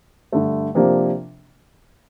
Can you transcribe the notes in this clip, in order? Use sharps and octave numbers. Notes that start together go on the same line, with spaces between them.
G2 D3 A3
C3 F3 A#3 D4